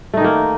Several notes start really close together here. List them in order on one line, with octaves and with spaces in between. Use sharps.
A3 D#4 D#3 A#3